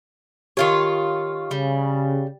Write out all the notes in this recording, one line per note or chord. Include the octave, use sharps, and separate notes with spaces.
D#3 F4 G4 C#5
C#3 G3